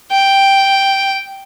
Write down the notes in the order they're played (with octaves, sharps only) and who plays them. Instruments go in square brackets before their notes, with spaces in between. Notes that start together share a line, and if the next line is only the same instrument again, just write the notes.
[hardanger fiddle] G5